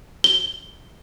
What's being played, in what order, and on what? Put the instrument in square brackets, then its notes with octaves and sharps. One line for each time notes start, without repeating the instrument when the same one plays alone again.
[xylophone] G7